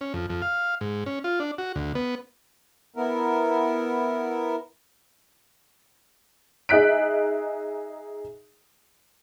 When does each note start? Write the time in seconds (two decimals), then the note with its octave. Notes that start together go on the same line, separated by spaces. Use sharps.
0.01 C#4
0.14 F2
0.30 F2
0.42 F5
0.81 G#2
1.06 C#4
1.24 F4
1.40 D4
1.58 F#4
1.75 D2
1.95 B3
2.96 B3 E4 A#4
6.69 D#4 G#4 E5 F#6 B6 D7